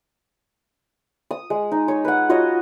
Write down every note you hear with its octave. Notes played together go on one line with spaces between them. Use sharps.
D#6
G#3
D#4
C#5
B4 F#5
F4 F#4 C#5 D#5